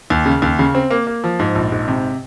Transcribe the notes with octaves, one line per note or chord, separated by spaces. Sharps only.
D#2
C#3
D#2
C#3
C4
A#3
A#3
F3
G#2
A#1
G#2
C3